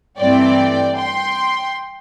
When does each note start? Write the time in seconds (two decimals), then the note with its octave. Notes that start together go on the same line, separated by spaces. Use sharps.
0.19 G2 E3 A3 C4 D5 G5
0.98 G5 C6